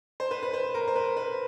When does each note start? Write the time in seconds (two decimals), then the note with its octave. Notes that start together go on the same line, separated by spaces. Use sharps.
0.20 C5
0.31 B4
0.43 B4
0.53 C5
0.74 A#4
0.87 C5
0.95 B4
1.17 B4